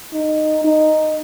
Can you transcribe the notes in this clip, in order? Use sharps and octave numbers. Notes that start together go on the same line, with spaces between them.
D#4
D#4